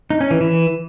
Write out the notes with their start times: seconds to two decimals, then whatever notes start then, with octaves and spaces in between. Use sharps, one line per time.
0.10 D#4
0.21 C#4
0.31 E3
0.41 E3